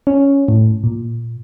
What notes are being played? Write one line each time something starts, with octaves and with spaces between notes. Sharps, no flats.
C#4
A2
A#2